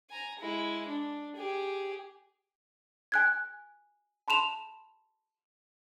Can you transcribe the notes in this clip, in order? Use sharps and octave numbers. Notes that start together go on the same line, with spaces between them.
G#5 A#5
G#3 E4
D4
G4 G#4
G#5 F#6 G#6
A5 B5 C6 E7 F7